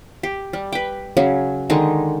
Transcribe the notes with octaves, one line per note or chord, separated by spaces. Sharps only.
G4
G3
B4 G5
C#3 F#3 C#4
D3 D#3 G#3 D#4